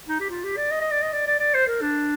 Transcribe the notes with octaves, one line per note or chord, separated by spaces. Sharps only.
D#4
G4
F4
G4
D5
D#5
D#5
D5
D#5
D5
D5
D5
C5
A#4
D4